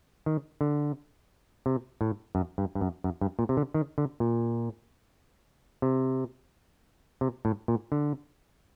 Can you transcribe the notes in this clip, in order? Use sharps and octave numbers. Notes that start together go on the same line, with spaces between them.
D#3
D3
C3
A2
F#2
G2
G2
F#2
F#2
G2
A#2
C3
D3
D#3
D3
A#2
C3
C3
A2
A#2
D3